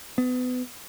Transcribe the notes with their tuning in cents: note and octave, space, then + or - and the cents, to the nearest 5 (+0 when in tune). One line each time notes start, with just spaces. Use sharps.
B3 +30